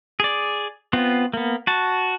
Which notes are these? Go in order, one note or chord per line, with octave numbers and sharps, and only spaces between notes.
G#4 D5
B3 C4 F4
A#3 B3
F#4 A5